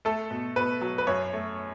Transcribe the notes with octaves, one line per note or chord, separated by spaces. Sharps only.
A3 A4
B2
B2 B4
F#3
B4
F#2 C#5
A3